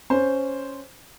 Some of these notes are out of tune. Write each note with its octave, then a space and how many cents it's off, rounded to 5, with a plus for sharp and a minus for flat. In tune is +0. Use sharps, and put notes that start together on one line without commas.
C#4 +0 C5 +0